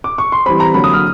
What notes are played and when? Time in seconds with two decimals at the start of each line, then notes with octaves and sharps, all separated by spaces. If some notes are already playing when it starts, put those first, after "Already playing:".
0.04 D6
0.18 C#6
0.32 C6
0.46 E3 G3 C4 B5
0.60 A#5
0.74 D3 F#3 A#3 B5
0.84 D#6
0.94 F6